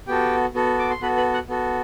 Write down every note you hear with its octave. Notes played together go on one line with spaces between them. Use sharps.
B3 F#4 G4 A4 G5
B3 F#4 A4
D6
C6
B3 F#4 A4 B4 B5
B4 B5
F#5 F#6
B3 F#4 A4